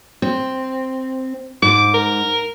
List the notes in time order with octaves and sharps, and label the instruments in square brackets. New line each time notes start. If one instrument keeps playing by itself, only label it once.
[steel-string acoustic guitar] C4
[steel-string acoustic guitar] G#2 [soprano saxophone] D6
[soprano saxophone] A#4